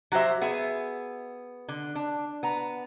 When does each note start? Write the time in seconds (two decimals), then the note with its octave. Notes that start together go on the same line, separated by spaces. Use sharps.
0.12 F#3 F#4 G4 C5 E5
0.41 B3 G#4 E5
1.68 D3
1.95 D4
2.43 B3 A#5